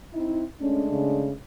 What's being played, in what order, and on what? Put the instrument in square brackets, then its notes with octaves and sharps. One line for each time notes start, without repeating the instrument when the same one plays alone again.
[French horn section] C4 D#4 E4
[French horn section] G#3 A3 D4 [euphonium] C#4
[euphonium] C#3